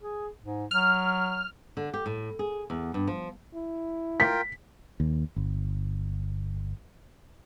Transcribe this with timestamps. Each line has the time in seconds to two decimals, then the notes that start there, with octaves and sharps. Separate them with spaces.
0.01 G#4
0.44 G#2
0.71 F#3 F6
1.77 D3
1.94 G4
2.06 A2
2.39 G#4
2.70 E2
2.94 G2
3.07 F3
3.54 E4
4.20 F4 A#4 G5 B6
5.00 D#2
5.36 G1